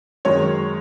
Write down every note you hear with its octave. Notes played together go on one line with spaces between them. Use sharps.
F#2 D#3 G#3 C#5